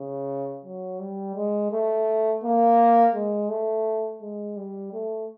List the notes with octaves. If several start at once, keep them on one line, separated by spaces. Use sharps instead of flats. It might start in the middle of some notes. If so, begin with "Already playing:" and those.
Already playing: C#3
F#3
G3
G#3
A3
A#3
G#3
A3
G#3
G3
A3